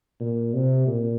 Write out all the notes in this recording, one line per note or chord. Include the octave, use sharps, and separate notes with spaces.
A#2
C3
A#2